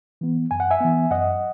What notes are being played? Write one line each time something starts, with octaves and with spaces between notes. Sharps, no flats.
E3 B3
F#2 G#5
F#5
E5 G#5
E3 B3
F#2 D#5 F#5